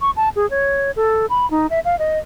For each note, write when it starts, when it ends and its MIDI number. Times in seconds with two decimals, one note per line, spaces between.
0.01 0.11 85
0.16 0.29 81
0.36 0.49 68
0.50 0.91 73
0.96 1.26 69
1.30 1.49 83
1.50 1.67 63
1.70 1.80 76
1.85 1.98 77
1.99 2.19 75